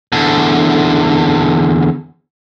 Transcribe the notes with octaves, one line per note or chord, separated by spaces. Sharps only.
E2 D3